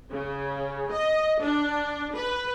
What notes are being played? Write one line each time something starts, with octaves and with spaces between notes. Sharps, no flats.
C#3
D#5
D4
B4